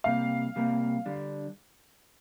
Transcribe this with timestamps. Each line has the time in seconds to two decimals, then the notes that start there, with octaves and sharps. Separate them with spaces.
0.04 C3 G3 A#3 F5
0.56 C3 G3 A#3
1.06 D3 G3 D4